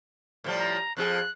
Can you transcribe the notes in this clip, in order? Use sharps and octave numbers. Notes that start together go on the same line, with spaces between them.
A2 F3 G3
A#5
F2 F3 G#4 F#6